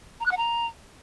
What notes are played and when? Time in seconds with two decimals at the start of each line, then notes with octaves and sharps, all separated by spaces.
0.20 A#5
0.26 F#6
0.31 F#5
0.37 A#5